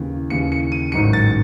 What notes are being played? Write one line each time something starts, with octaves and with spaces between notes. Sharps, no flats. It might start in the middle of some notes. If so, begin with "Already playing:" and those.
Already playing: D#2 C#3 E3
D#2 C#3 E3 C#7
C#7
D#7
A1 G#2 D#3 F#3 C#7
A6